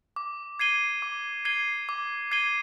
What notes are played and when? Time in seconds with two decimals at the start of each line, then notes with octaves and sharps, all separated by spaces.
0.16 D6
0.59 G#6 C7 D#7 G7
1.02 D6
1.45 G#6 C7 D#7 G7
1.89 D6
2.31 G#6 C7 D#7 G7